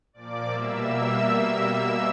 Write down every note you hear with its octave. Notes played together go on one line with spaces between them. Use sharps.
A#2 F3 A#3 D5 D6
B2 G3 A#3 E5 E6